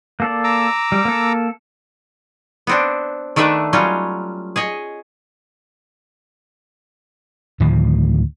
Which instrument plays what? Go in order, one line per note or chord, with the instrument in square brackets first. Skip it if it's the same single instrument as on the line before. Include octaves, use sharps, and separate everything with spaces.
[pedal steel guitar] A#3 A4 D5
[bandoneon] A#5 D6 E6
[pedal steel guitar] G3
A#3 A4
[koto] B3 C4 D4
D#3 A3 D4 B4 E5
F#3 G3 C#4 F4
G#4 C#5 D#5
[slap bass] D2 A2 D#3 F3